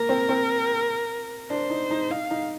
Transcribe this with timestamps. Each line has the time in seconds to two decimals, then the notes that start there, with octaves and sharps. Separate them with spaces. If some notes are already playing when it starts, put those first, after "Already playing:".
Already playing: A#3 A#4
0.09 C4
0.29 C4
1.50 D4 C5
1.70 D#4
1.91 D#4
2.10 D#4 F5
2.31 D#4